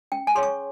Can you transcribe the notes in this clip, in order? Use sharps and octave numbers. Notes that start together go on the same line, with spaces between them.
C#4 G5
G#5
G#4 C#5 C6
C#6